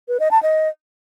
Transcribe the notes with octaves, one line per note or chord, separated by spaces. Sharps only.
B4
D#5
A5
D#5